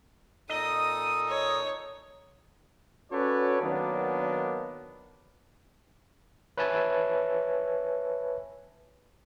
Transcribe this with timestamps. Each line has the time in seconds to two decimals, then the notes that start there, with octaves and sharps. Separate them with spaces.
0.49 A#2 D#4 A4 D#5 D#6
1.28 C#5
3.11 C#4 F#4 A4 B4 C#5 D5
3.61 D#3 F#3 A#3 B3 D4
6.58 B4 C#5 E5 G#5 A5 B5